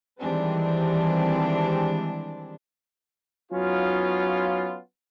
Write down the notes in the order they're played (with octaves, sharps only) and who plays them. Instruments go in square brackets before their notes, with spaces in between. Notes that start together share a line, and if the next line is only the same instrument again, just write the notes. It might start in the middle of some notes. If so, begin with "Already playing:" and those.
[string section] D#3 E3 G3 G#3 C4 D4
[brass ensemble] F#3 B3 C#4 D#4 F4